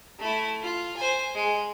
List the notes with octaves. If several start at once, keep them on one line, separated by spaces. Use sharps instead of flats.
A3 E4
F4
C5 G#5
G#3